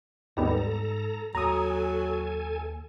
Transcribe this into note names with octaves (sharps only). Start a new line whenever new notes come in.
D#2 G#2 G3 B3 A4 A#5
D#2 F#3 A#3 A4 G#5 A#5 D#6